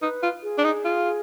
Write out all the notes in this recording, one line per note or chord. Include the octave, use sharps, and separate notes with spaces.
D#4 B4
F4
G#4
D4
D#4
F4